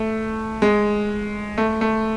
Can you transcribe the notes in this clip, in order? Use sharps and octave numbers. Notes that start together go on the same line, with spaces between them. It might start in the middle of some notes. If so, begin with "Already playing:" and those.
Already playing: A3
G#3
A3
A3